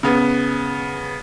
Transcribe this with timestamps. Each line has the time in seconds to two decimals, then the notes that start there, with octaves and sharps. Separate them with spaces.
0.03 C#3 B3